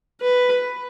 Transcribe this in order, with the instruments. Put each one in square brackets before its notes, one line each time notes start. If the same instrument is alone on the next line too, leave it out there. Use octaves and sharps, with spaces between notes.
[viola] B4